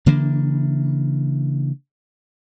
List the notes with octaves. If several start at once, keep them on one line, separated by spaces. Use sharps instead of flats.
C#3 E3 A#3 D4